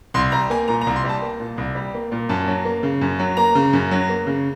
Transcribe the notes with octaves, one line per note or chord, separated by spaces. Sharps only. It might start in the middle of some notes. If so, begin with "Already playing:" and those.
C2 C6
G3 A#5
A#3 G#5
A#2 A#5
A#5
C2
C6
G3 A5
A#3
A#2
C2
G3
A#3
A#2
F#2 A5
F#3
A#3
C#3
F#2
F#3
A#3 A#5
C#3
F#2
F#3
A#3
C#3